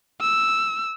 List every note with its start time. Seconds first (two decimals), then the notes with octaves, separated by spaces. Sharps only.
0.21 E6